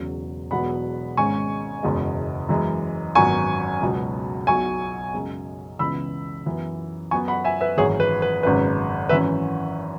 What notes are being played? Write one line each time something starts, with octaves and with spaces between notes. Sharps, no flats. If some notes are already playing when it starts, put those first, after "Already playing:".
Already playing: E1 E2 C#3 F#3
E1 E2 B2 F#3 B3 F#5 B5
G#1 G#2 G#3 C#4 G#5 C#6
F#1 E2 B2 G#3
F#2 E3 G#3
G#1 F#2 F#3 B3 G#5 C#6
C#2 B2 F#3 B3
B1 B2 F#3 G#5 C#6
F#2 C#3 G#3
C#2 C#3 E3 B3 B5 E6
F#2 E3 B3
F#2 F#3 B3 G#5 C#6
F#5 B5
E5 G#5
B4 E5
G#1 F#2 E3 G#4 C#5
B4
B4
G#1 F#2 C#3 G#3 C#4 B4
G#1 F#2 E3 C#4 B4 E5